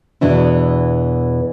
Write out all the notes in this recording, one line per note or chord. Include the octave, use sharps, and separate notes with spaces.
E2 B2 E3 D4 E4